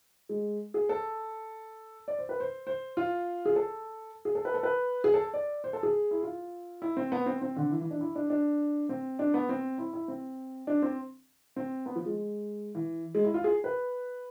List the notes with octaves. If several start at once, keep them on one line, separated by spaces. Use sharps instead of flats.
G#3
G#4
A4
D5
C5
B4
C5
C5
F4
G#4
A4
G#4
A4
B4
A4
B4
G#4
A4
D5
C5
A4
G#4
E4
F4
E4
C4
B3
C4
C4
D3
E3
E3
D4
E4
D4
D4
C4
D4
B3
C4
E4
E4
C4
D4
C4
C4
B3
F3
G#3
E3
G#3
E4
F4
G#4
B4